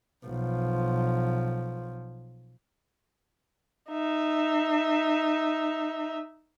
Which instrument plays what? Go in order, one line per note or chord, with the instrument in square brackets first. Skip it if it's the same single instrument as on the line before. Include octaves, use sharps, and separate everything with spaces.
[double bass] B1 F3
[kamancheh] D#4 E5